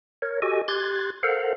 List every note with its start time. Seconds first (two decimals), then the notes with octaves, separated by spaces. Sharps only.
0.22 A#4 C#5
0.42 F#4 G4 A4 D#5 G#5
0.68 G4 C6 F#6 G#6 A6
1.23 A4 A#4 C5 F5 F#5